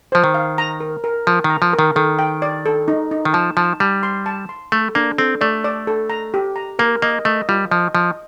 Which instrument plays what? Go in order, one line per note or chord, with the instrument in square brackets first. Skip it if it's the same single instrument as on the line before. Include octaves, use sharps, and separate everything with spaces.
[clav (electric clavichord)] F3 [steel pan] C5
[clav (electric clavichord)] D#3
[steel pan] F5
A#5
A#4
A#4
[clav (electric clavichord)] F3 [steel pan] A#4
[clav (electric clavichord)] D#3
[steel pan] A#5
[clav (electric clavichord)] F3
[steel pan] A#4
[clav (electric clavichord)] D#3
[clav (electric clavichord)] D#3 [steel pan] A4
[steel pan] G5
D5
A4
D#4
D#4
[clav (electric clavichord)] D#3
[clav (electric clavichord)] F3 [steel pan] A5
[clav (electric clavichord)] F3 [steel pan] A5
[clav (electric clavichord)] G3 [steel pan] A5
[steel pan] C6
A5
C6
[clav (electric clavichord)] A3 [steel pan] A4
[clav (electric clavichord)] A#3 [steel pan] D4
[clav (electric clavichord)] C4 [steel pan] A4
[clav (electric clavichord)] A3 [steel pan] D5
[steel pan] D5
A4
A#5
G4
A#5
[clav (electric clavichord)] A#3 [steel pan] A#4
[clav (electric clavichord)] A#3 [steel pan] D#5
[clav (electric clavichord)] A3 [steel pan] D#5
[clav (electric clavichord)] G3 [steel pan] F4
[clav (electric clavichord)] F3 [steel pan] D#5
[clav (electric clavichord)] F3 [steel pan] D#5